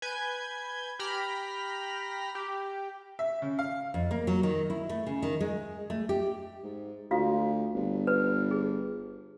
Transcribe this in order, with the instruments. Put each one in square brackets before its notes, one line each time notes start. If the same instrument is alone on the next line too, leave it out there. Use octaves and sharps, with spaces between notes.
[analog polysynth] B4 G#5 G6 G#6
G4 G5 A#5 B5 F6
G4
[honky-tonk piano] E5
C#3
F5
[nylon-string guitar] F2
A#3
F#3
D#3
E4
A3
C#3
D#3
G#3
A3
G4
[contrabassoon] G#2
[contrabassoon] D2 [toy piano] F4 F#4 F5
[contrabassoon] G1
[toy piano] B4
G#4